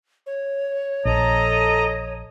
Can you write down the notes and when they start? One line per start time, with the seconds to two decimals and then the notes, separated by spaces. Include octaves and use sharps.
0.26 C#5
1.05 A#1 A4 D#5 A#5